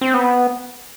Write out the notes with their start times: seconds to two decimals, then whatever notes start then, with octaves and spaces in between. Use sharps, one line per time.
0.01 C4
0.14 B3